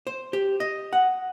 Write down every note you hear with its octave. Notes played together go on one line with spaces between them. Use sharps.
C5
G4
D#5
F#5